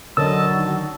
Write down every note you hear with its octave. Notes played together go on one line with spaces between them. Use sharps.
D3 F#3 C#4 A#4 D#5 A5 E6
D#3